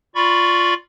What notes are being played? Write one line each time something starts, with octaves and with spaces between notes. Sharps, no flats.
F4 D5 B5 C#6